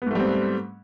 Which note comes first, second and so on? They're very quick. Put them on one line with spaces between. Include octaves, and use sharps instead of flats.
B3 G#2 A3 G3 C4